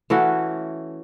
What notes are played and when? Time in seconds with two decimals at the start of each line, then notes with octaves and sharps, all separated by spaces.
0.10 E3 A3 C#4 F#4